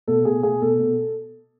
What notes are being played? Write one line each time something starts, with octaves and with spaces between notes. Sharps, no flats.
B2 A4
B2 G#4
B2 G#4
B2 A4
B2